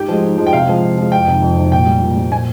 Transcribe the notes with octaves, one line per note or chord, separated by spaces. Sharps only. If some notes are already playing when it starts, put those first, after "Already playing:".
Already playing: G#2 G4
F3 G#3
G#2
F3 G#3
G5
C3 F5
F3 G#3
C3
F3 G#3
F2 G5
C3 D#3
F2
C3 D#3
A#2 G5
G3
A#2
G3
A#2 G#5